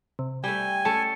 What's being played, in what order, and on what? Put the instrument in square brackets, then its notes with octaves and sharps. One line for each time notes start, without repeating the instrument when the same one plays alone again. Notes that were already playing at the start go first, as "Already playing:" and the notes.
[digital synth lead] C3
[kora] G3 A3 [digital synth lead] G5 [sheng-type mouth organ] G#5
[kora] A3 C#4 A4 [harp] A5 C#7